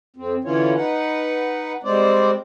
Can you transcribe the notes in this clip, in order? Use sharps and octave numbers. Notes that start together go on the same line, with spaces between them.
F2 C4
D3 E3 C#4 E4 F4 C#5
D#4 B4 F#5
G3 G#3 C4 C5 D5